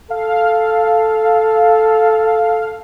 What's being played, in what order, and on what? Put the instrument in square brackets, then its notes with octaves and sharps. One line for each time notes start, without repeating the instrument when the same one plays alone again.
[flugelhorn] A4 [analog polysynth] F5